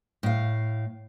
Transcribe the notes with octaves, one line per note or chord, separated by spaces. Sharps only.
A2 F5